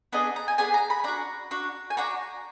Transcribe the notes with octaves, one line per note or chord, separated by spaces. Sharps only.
B3 D4 G#4 D#5
A#5
G#5
B3 D4 G#4 G#5
A#5
B5
D4 F#4 A#5
D4 F#4
G#5
D4 F#4 A#5